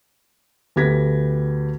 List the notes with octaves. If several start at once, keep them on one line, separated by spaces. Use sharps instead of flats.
D2 B3 G4 G#6 A#6 B6